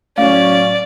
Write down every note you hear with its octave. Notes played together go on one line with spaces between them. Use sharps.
A2 F#3 C#4 D5 F5